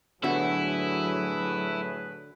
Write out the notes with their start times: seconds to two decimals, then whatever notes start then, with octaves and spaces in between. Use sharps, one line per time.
0.24 A2 D3 F#3 B3 E4 F#4 G#4 B4